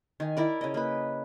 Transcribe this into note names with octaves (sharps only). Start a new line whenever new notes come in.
D#3 G#5
E4 A#4 D5
C#3 D#5
A#3 B4